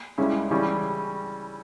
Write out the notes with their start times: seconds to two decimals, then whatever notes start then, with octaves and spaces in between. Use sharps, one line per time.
0.18 C#2 C#3 G3 C#4 E4
0.51 C#3 E3 G3 C#4